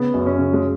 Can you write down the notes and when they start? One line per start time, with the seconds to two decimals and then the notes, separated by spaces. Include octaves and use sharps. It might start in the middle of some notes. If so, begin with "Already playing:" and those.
Already playing: C#3 B3
0.14 F#2
0.26 C#4
0.38 C#3
0.53 G#3